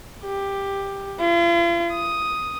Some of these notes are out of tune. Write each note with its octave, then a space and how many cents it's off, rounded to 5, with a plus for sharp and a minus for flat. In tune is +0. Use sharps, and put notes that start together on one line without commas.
G4 +10
F4 -45
D#6 +5